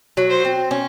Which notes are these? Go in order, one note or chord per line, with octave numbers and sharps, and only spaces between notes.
F#3
C5
C4
C#4